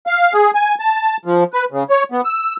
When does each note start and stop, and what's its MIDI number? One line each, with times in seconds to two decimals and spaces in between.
0.07 0.33 77
0.33 0.51 68
0.55 0.75 80
0.79 1.17 81
1.25 1.44 53
1.53 1.65 71
1.72 1.83 49
1.90 2.03 73
2.12 2.21 59
2.25 2.57 88